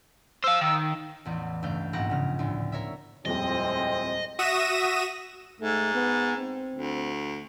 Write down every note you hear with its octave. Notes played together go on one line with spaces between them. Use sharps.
C5 F5 E6
D#3
A1 E2
C#2 G2 A3 F5 G6
A#1 G#2 B3 G4 F#5 A#6
G2 C#3 F6
D2 A2
A#4 C#5 E5
D#1 F2 A2 G#3 C4 D#5
F#4 E5 D#6 A#6 D#7 E7
G#2 A3
B3
C4
D2